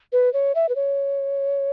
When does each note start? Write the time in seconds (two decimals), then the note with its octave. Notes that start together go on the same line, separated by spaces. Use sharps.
0.12 B4
0.33 C#5
0.55 E5
0.69 B4
0.75 C#5